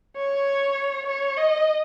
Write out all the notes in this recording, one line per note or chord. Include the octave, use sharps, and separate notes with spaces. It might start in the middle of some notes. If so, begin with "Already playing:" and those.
C#5
C#5
D#5